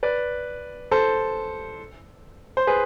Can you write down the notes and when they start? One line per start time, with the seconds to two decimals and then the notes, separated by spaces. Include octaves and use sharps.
0.03 B4 D5
0.91 A4 C5
2.57 C5
2.67 G#4 B4